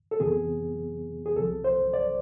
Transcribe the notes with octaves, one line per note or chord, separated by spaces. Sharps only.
A4
F2 C3 E3 B3 G#4
G#4
C2 C3 F3 A4
C5
D5